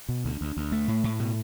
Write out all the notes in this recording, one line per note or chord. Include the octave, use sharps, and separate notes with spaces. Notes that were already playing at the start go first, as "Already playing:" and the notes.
B2
D2
D2
D2
A3
A2
A2
B2